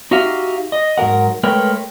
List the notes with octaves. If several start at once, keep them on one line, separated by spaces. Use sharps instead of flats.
D#4 F#4 G4 E5 F5
D#5
G#2 F#3 A#4 F#5
G#3 A3 A#4 B4 C#5 G5